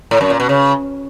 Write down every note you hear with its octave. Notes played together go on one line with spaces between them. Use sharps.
A2
F#2
A#2
B2
C#3